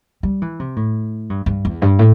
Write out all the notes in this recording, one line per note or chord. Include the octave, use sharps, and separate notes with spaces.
G3
E3
C3
A2
G2
G2
E2
G2
A2